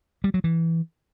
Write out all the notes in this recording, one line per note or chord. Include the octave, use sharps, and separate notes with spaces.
G3
F#3
E3